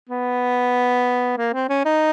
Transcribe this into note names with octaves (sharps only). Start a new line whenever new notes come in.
B3
A#3
C4
C#4
D#4